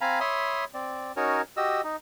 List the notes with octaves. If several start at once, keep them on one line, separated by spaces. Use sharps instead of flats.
C4 F5 G#5 A#5 B5
C#5 E5 B5 C6 D#6
C4 D5
C#4 D#4 F#4 A#4 C#5
F#4 G4 D#5 E6
D#4